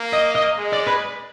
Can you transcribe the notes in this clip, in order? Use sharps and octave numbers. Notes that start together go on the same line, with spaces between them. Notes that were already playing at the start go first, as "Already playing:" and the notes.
Already playing: A#3
D#5
D#5
G#3
D5
B4